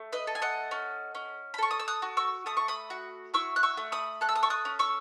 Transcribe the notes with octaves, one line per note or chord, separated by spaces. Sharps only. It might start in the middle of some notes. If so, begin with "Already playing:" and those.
Already playing: A3
B4 D#5
A4
G#5
D#5 F#5
C#4
C#4
B5
A4 C#6
D#6
E6
D#6 F#6
F#4
C#6 E6
A3 D#6
C#6
B5 D#6
F#4
E4 C#6 E6
F#6
C#6 E6
A3
B5 D#6
A4 F#6
E6
D#6
C#6 E6
D#6 F#6
C#4
C#6 E6